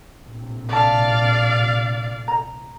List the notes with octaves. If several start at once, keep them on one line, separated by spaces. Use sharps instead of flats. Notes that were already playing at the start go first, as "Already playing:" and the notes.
A#1 A2 C3
D5 E5 F5 A5
A#5